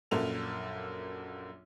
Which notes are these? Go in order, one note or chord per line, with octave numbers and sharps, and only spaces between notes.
A#1 F#2 A#3 A4 F7